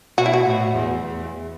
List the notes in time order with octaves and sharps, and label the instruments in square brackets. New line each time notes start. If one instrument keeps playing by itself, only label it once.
[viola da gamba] B2 [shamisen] F#4
[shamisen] E4
F#4
[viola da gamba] A2
E2
E2